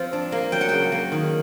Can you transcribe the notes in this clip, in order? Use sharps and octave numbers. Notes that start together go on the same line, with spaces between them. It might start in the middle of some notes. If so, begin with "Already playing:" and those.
Already playing: F3 C4
D4
A#3
F#3 G5
F#5
C#3 G5
A#3
D#3